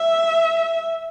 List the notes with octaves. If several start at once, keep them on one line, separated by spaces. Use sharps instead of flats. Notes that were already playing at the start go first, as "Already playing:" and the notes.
Already playing: E5